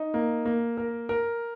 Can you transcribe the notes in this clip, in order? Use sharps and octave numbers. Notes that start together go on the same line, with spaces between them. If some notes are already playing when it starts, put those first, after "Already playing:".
Already playing: D#4
A#3
A#3
A#4
A#4